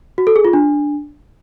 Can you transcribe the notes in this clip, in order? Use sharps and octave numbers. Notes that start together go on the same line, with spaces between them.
F#4
A4
G#4
F4
D4